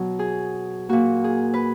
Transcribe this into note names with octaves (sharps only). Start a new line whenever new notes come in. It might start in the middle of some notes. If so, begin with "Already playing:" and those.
Already playing: B2 F#3
G#4
A#2 A#3 F#4
G#4
B4